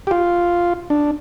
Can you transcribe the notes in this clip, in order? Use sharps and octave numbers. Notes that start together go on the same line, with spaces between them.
G4
F4
D4